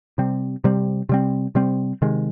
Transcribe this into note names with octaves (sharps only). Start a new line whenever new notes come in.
C3 G3 C4
C3 G3 C4
C3 G3 C4
C3 G3 C4
C3 D#3 G#3